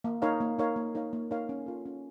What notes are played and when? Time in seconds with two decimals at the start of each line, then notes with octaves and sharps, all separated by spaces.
0.04 A#3
0.22 D#4 A#4 C#5 F5
0.40 A#3
0.59 D#4 A#4 C#5 F5
0.76 A#3
0.95 D#4 A#4 C#5 F5
1.13 A#3
1.31 D#4 A#4 C#5 F5
1.49 C#4
1.66 F4 A4
1.85 C#4